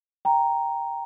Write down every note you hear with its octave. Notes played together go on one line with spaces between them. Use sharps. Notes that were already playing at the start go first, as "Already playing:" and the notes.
G5 A#5